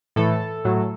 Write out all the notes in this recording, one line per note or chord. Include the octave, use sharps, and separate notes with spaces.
A2 E3 A4
A2 F#3